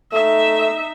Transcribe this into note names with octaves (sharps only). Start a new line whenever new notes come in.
A3 D#4 E5